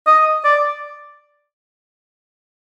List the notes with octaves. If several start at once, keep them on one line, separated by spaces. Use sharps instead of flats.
D#5
D5